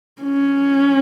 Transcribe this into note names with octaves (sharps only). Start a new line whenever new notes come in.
C#4